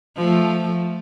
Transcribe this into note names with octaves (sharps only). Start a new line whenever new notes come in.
F3 A3